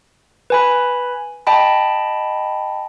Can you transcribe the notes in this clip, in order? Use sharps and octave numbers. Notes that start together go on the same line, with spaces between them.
B4 G#5 B5
D#5 G5 A5 B5